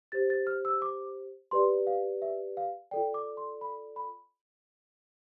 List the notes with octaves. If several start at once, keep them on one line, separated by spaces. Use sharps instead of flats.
G4 C5 A6
A6
F6
E6
D6
G4 B4 D5 C6
F5
E5
F5
F4 A4 D5 G5
D6
C6
B5
B5